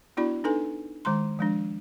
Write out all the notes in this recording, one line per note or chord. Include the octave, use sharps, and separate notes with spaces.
B3 D4 E4 F#4 D5 B5
D4 D#4 A4 B4 G#5
D#3 G#3 A#5 C6
F3 G#3 D4